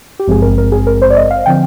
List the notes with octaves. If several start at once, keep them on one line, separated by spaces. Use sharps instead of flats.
G4
G#1 G2 F3 G#3 C4 G#4
A#4
A#4
G#4
A#4
C5
D5
D#5
F5
D3 F3 C4 G5